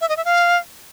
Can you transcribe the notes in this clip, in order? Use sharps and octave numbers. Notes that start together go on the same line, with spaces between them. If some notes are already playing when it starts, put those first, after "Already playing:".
E5
D#5
E5
F5